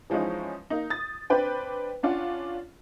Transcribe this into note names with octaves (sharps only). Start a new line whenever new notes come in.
E3 F3 G#3 C#4 D#4
A#3 D#4
D#6 A6
C4 D4 B4 C5 G5
C#4 D4 F4 F#5